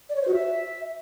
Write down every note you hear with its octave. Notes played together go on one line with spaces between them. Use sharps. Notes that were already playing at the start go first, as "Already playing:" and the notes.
D5
C#5
C5
F#4
E5